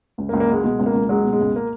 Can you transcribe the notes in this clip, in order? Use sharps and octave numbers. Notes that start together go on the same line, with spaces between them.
C#2
A#3
C#2
A#3
F#3 G#3
B2 G#3
C#2
A#3
C#2
F#3 G#3
B2
G#3
C#2
A#3